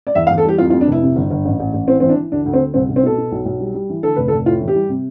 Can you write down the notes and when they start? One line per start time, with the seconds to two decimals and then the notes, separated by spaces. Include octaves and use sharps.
0.07 D5
0.15 E2 E5
0.27 F5
0.31 E2
0.38 A4
0.44 G3 G4
0.58 F2 F4
0.70 F4
0.73 F2
0.81 D4
0.88 F1 E4
1.02 C3
1.16 G1
1.31 G1
1.45 A1
1.60 A1
1.74 A1
1.88 E3 C4
2.00 E3 C4
2.09 D4
2.17 E3
2.32 D2 D4
2.46 D2
2.53 C4
2.61 D2
2.74 C2 C4
2.89 C2
2.96 C4
3.03 B2 A4
3.18 B2
3.32 B1
3.46 B1
3.60 G3
3.74 G3
3.90 E3
4.03 D3 A4
4.16 F1 B4
4.28 A4
4.32 F1
4.46 A2 F4
4.61 E3
4.68 G4
4.75 G3
4.89 C3